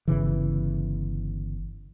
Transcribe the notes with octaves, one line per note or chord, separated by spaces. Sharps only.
G1 C#3 E3